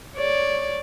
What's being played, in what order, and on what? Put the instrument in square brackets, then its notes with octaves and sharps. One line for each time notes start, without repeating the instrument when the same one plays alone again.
[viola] C#5 D5